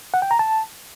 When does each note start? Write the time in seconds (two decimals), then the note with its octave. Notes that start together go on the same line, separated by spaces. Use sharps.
0.14 F#5
0.22 G5
0.31 A#5
0.39 A5